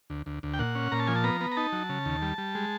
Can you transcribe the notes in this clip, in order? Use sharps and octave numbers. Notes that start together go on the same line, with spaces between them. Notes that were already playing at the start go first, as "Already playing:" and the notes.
D2
D2
D2
G5
A#2 F#5
C#4
A#2 A#5
A5
F3 G#5
A5
B3 A#5
B3
A#5
D#4 A5
F#3
C#3
D#2
G3
G3
G#3